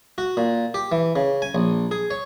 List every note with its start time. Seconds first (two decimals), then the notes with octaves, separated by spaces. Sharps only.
0.18 F#4
0.37 A#2
0.74 G4
0.92 E3
1.16 C#3
1.42 G#5
1.55 A#1
1.91 G#4
2.11 C#5